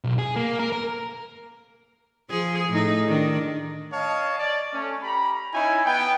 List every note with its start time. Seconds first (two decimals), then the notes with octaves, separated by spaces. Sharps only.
0.04 B1
0.18 G#4
0.36 A#3
0.59 A#4
0.72 A#4
2.30 F3 G#4
2.69 A2 D#4
3.08 D#3 D4
3.93 C#5 D#5 F5 A5
4.39 D5
4.74 A3 C#4
5.03 G4 A#5 B5
5.54 C#4 D#4 E4 G#5
5.86 B3 G5